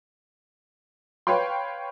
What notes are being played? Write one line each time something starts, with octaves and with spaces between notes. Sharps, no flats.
B4 C#5 F5 G5 C6